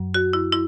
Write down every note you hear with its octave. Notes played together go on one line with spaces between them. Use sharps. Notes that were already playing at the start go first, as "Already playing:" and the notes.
Already playing: F#2 F#3
F#4
E4
E4